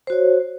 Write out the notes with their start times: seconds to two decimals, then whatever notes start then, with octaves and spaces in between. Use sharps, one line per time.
0.07 C5
0.10 F#4
0.12 C#5